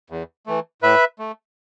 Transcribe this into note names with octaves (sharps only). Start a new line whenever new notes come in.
E2
E3 A3
A2 B4 E5
A3